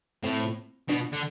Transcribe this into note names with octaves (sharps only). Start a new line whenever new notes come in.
A2 C4
B2 D4
D3